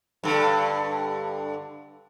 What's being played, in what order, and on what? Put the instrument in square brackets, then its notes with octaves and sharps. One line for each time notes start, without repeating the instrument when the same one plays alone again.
[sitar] G2 D3